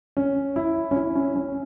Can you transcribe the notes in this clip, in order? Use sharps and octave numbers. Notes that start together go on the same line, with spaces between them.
C#4
E4
C#4
E4
C#4
C#4